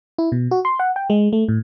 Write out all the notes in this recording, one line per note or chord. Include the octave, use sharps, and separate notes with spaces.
E4
B2
F#4
C6
F#5
G5
G#3
A3
A2